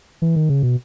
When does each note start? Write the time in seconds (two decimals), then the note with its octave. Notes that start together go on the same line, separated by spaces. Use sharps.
0.22 E3
0.36 D#3
0.49 C#3
0.63 B2